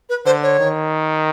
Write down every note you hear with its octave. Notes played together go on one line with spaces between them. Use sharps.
B4
D3 C5
C#5
D#3